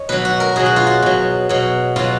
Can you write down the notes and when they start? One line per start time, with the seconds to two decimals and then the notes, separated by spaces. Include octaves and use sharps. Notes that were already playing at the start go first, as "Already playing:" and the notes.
Already playing: C#5 D#5
0.09 B2 F#3 B4
0.25 F#4
0.40 A#4
0.56 B2 F#3 G#4
0.66 F#4
0.76 F4
0.87 F#4
1.02 B2 F#3
1.49 B2 F#3
1.96 B2 F#3 F4